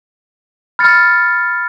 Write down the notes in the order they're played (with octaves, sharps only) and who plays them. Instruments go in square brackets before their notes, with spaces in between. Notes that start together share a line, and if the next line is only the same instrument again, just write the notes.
[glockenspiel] B5 F6 A6 C#7